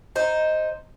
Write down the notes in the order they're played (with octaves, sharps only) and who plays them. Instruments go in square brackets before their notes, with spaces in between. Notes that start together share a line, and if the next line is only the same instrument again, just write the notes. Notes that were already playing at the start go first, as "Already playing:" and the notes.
[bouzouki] D#4 C5